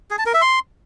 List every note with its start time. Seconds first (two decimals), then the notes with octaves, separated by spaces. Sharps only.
0.11 G#4
0.18 A5
0.26 A#4
0.34 E5
0.42 C6